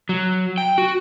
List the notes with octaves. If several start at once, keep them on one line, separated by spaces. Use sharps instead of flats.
F#3
G5
F#4